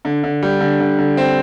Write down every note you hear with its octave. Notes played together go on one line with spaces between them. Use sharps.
D3
D3
G3
D3
D3
D3
C4